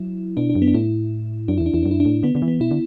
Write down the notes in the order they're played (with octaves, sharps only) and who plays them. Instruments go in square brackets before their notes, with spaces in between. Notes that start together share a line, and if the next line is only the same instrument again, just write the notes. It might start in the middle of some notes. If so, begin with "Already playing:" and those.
Already playing: [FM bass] F#3 [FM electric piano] E4
[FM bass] B2 [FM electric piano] D4
[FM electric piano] D4
[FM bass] F#2
[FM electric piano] B3
D4
[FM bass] A2 [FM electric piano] E4
[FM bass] F#2 [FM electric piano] D4
[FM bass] E2 [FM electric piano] E4
[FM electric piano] D4
[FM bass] E2 [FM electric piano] E4
[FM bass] F#2 [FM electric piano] D4
[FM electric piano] E4
D4
[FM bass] A2
[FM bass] D3 [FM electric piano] B3
[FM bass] D3 [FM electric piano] B3
[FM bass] E3
[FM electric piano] B3
[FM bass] B2 [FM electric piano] E4
[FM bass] D3